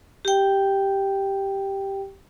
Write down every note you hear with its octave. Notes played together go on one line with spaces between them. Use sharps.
G4 G5